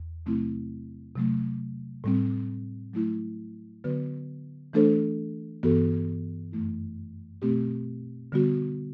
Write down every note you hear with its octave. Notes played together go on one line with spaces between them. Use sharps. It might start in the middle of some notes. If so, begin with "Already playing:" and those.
Already playing: E2
C3 F#3 A3 C4 E4
C3 F#3 A3
A2 G3 C4
F#3 A3 E4
D3 F#3 B3 F#4 B4
E3 A3 D4 A4 C5
G2 E3 B3 F#4 A4
F#2 E3 A3 E4
B2 A3 C4 G4
D3 G3 B3 F#4